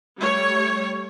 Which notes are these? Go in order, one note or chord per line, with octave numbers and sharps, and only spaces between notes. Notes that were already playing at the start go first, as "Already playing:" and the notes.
G3 A3 C#5